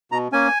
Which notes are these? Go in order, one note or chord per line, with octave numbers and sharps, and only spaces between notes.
B2 A#5
A#3 C#4 G#5